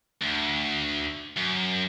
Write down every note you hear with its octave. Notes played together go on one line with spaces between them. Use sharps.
D2
F#2